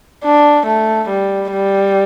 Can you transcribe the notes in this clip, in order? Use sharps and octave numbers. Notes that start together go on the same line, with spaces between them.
D4
A3
G3
G3